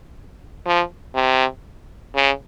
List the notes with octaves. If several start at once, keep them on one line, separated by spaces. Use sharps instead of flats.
F3
C3
C#3